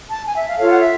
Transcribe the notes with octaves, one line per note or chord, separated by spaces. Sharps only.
A5
G#5
E5
F5
F4 A4 C#5 F5
F#5
E5